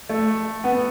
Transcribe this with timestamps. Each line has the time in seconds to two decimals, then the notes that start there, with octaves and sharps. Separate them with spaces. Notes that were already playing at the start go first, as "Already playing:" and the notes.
0.09 A3
0.64 B3